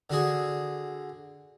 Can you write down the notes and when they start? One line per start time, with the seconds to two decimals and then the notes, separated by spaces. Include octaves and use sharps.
0.10 D3 F#4 G#4